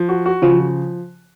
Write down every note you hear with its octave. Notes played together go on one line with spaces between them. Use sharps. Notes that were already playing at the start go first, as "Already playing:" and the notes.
Already playing: F3
F#4
F#4
C#3 F3
F3